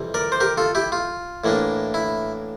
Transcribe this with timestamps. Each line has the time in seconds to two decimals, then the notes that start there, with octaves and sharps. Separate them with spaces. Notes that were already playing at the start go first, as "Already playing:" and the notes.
Already playing: F2 C3 E3 G3
0.14 A#4 D5
0.32 C5
0.40 G4 A#4
0.57 F4 A4
0.75 E4 G4
0.92 F4
1.44 A2 E3 A#3 D4
1.94 E4